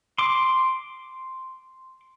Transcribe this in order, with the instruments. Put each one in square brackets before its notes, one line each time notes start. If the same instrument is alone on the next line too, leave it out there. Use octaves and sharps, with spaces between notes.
[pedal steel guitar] C6 D6